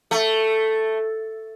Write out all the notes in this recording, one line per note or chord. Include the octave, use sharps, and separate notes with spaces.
A3